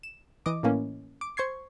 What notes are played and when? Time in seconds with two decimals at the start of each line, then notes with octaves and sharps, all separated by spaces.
0.03 E7
0.46 E3 D#5 D6
0.63 A2 E3 A#3 C#4
1.21 D6
1.37 C5 C#6 G#6 C7